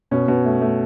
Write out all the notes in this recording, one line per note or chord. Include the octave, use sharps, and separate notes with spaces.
B2 C#4
B2
A3
A3